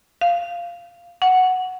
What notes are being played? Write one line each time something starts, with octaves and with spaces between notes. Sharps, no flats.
F5
F#5